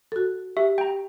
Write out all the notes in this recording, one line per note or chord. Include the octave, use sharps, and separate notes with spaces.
F#4 A4
G4 E5
G5 A#5